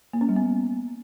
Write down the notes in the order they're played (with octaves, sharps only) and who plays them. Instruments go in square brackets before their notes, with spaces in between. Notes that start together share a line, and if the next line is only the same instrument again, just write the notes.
[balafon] A#3
C#4
G3
B3